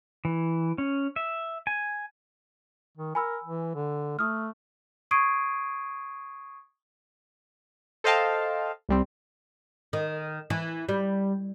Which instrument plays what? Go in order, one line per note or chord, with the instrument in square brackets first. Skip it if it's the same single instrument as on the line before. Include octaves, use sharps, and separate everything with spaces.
[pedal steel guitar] E3
C#4
E5
G#5
[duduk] D#3
[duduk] A#4 [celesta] G#5 B5 E6
[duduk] E3
D3
[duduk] A3 [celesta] D#6 F6
[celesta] C#6 D#6 G#6 C7 D7 D#7
[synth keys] A4 C5 D#5 F5 G5 A5
C2 G3 C4
[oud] D#3
E3
G3